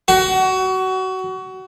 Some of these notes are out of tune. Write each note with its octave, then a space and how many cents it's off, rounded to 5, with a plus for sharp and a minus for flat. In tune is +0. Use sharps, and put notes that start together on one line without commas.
F#4 +25